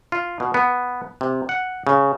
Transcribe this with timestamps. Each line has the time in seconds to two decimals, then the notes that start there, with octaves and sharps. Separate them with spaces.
0.12 F4
0.40 B2
0.54 B3
1.21 C3
1.49 F#5
1.87 C#3